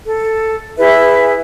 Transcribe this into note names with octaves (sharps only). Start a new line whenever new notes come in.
A4
E4 G#4 B4 E5